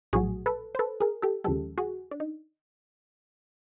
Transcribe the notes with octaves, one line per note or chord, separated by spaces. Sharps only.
A#1 A2 F#3 F#4 G#4
A4 B4
C5
A4 B4
G#4 A#4
G4 A4
D#2 C#3 F3 G#3 G4 A4
F#4 G#4
D4
D#4